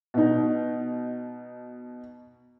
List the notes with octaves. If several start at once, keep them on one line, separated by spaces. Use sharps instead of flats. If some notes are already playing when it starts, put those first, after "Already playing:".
B2 D#4